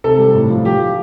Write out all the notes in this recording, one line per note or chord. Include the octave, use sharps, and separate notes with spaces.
C3 A4
G3
A2
F3
F3 G4
F3